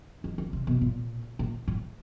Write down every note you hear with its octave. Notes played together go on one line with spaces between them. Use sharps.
D#3
D3
C3
B2
A#2
A#2
A2